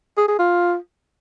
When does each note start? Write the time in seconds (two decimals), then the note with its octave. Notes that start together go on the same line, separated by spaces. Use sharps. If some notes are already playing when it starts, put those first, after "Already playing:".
0.17 G#4
0.28 G#4
0.39 F4